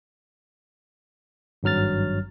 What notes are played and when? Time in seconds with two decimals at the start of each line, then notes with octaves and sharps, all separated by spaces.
1.63 G#1 G2 F#3 F6 A6